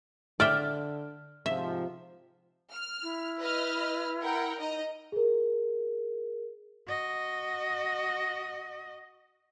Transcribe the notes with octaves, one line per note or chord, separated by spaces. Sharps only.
D3 D5 E5 G5 F6
G#2 C3 F3 E5
F6
E4
B4 D#5 F6
A#4 F#5 G5
D#4 D#5 A#5
G#4 A#4
F#4 D#5